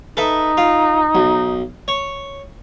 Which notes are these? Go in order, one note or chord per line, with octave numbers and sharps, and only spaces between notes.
D#4 A4 B4 E5
F4
B1
C#5